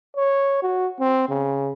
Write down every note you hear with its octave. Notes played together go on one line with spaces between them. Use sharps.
C#5
F#4
C4
C#3